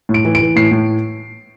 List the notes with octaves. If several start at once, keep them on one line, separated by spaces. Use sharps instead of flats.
A2
D7
E3
D7
E3
A2 C7
A2